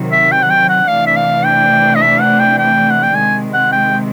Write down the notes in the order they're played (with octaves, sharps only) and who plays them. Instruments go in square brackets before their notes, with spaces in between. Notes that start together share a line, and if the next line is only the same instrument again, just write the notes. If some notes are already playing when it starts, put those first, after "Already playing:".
Already playing: [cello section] C3 D#3 F#3
[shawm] E5
G5
F#5
G5
F#5
[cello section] C3 E3 A3 D4 [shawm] F5
[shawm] E5
F5
G5
D#5
E5
F#5
G5
G5
F#5
G5
[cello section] C3 D#3 G#3 [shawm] G#5
[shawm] F#5
G5